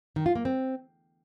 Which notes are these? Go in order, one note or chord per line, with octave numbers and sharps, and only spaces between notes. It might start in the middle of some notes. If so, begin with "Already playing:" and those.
D#3
F4
A#3
C4